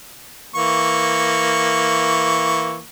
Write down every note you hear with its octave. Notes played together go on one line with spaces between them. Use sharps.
E3 A#3 C#6